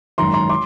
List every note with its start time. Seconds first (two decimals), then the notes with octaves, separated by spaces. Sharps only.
0.18 G#1 F#2 D#3 A#5 C6
0.34 A#5 C6
0.49 C6 D6